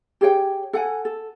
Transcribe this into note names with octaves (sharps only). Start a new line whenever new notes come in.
G4 G#4 C#5 G5
A4 F#5 G#5
A4